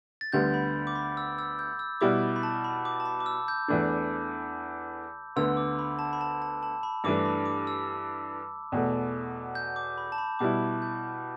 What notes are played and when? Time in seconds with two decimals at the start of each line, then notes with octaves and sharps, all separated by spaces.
0.21 A6
0.33 D2 D3 G3 B3 G6
0.54 B5
0.87 D6
0.95 B5
1.17 E6
1.39 E6
1.59 G6
1.79 E6
2.01 B2 G3 E4 D6
2.36 B5
2.43 A5
2.64 B5
2.85 D6
3.00 A5
3.06 B5
3.20 D6
3.26 E6
3.48 G6
3.68 E2 E3 A3 D4
5.36 D2 D3 B3 E6
5.57 D6
5.79 B5
5.99 A5
6.13 B5
6.21 A5
6.42 A5
6.63 A5
6.83 B5
7.04 G2 E3 A3 D4 D6
7.25 B5
7.46 D6
7.67 E6
8.72 E2 B2 A3
9.55 G6
9.76 D6
9.98 B5
10.12 A5
10.18 B5
10.39 B2 G3 E4 D6
10.82 G6